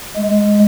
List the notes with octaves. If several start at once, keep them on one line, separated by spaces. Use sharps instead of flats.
G#3